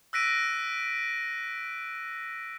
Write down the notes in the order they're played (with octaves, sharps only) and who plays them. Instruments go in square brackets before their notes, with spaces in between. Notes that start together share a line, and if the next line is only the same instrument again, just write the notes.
[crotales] E6 F#6 A#6 B6 D7 D#7